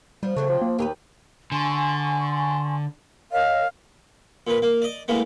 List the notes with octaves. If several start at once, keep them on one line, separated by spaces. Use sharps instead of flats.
F3 G3 B3
C#3 E3 F#3 A3 C4
F3
A#3
D#2 C4 G4 B4
D3 G#5 C6 C#6
A#4 C#5 D#5 F5
A#2 B4
A#3
D5 D#5
A2 G#3 A#3 B3